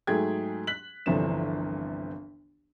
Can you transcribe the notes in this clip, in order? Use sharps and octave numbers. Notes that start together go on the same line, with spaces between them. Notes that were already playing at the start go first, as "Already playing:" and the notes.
G#2 F#3 A3 G#4 G5 G#6
F#6 B6 F#7
G1 C2 E3 F3 D4 E7